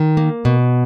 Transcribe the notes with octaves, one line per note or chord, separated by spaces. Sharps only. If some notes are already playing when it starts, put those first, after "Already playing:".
Already playing: D#3
A#3
B2